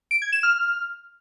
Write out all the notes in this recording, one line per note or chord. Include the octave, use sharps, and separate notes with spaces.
D7
G#6
E7
F6